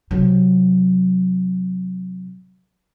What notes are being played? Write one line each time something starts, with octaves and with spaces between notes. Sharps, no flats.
C3 F#3